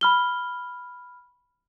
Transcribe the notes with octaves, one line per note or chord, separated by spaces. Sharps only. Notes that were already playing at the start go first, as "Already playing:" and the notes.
B5 F6 G7